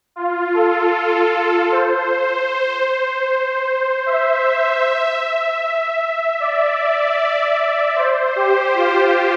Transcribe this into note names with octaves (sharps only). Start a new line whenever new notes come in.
F4
A4
C5
E5
D5
C5
G4
F4